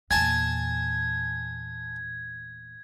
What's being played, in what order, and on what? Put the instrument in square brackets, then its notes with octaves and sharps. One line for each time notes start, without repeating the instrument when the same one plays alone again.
[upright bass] E2 A#2 [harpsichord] G#5 A5 [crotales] G#6